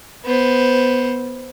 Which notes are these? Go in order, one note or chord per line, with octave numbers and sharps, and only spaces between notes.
B3 C5